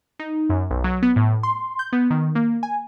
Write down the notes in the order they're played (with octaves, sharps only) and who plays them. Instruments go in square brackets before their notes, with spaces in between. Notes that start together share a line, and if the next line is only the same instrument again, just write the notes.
[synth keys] D#4
F#2
B1
F#3
B3
A2
C6
G6
B3
D#3
A#3
G#5